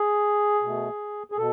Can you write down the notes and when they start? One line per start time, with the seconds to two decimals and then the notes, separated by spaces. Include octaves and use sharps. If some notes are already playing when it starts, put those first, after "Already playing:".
Already playing: G#4
0.63 B2 A3
1.32 G#4
1.37 B2 A4